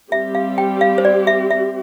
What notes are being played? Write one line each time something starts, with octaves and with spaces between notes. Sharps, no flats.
G3 C4 G4 E5
F5
G5
F5
C5
D5
E5
E5